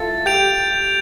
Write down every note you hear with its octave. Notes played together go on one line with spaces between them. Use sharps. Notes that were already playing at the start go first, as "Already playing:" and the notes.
Already playing: E4 F4 A4 A6
G4 G6 D7 F7